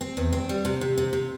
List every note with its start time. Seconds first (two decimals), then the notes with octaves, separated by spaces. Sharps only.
0.01 C4
0.17 E2
0.33 C4
0.49 G3
0.65 C3
0.81 C3
0.98 C3
1.13 C3